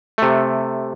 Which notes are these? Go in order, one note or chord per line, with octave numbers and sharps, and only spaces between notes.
C3 A3